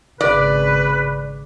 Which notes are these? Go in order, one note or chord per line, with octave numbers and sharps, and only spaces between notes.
G#1 C#3 B4 D5